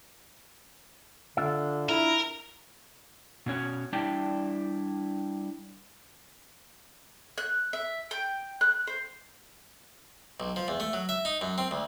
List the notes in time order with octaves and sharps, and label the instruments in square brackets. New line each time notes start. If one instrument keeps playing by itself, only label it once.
[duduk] D3 [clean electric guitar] D4 F4 E5
[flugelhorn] E4 [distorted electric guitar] A#4
[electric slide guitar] B2 C#4 C#5 F#5
G3 D4 E4 D5 G5 A5
[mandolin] F#6
E5
G5
F#6
C5
[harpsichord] B1
F3
E2
A3
F#3
E5
D#4
F#2
C4
D2